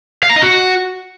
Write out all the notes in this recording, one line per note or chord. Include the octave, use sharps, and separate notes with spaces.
F5
A#5
D#5
F#4